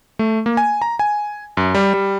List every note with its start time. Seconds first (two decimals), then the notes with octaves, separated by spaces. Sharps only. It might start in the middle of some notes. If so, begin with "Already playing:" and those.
0.19 A3
0.46 A#3
0.57 G#5
0.82 A#5
0.99 G#5
1.57 F#2
1.75 G3
1.94 G3